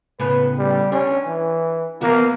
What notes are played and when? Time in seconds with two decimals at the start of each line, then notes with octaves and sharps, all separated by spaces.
0.20 A2 C#3 B3 B4
0.58 G3
0.92 C#4 D4
1.26 E3
2.01 E3 A#3 B3 F#4